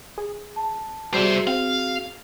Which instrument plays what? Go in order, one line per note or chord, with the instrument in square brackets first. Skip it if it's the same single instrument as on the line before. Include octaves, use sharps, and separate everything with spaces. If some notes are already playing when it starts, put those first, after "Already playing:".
[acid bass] G#4
[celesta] A5
[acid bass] G3 [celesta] F#4 G#4 [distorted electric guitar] C5 E5
[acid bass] C4 [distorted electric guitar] F5